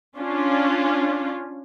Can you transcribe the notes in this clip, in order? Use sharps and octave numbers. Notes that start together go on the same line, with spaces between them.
C#4 D4 F4